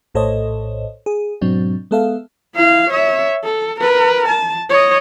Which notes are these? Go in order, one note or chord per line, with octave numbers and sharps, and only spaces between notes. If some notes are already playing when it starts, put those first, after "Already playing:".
A#1 A2 A4 C5 C#5 D#5
G#4
G#2 B2 F#3 C4 D4
G#3 B3 A4 E5 F5
E4 F5
C#5 E5
A4
A#4 B4
A5
C#5 D#5